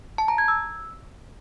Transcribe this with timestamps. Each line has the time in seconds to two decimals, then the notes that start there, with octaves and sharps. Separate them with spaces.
0.18 A5
0.28 A#5
0.38 G#6
0.48 E6